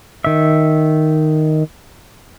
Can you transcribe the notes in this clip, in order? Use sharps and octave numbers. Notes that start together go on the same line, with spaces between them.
D#3 E5